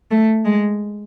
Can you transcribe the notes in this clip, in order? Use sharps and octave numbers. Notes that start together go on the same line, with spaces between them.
A3
G#3